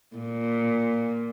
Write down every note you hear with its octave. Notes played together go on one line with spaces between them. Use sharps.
A#2